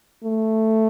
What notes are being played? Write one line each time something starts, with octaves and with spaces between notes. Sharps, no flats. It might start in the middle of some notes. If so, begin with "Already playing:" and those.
A3